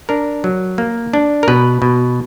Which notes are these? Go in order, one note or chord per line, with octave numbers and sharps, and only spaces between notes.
D4 A#4
F#3
A#3
D4
A#4
B2 B4
B2